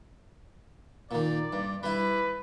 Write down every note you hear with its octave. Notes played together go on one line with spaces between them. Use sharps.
A#2 D#3 D5
G2
G3 E4 B4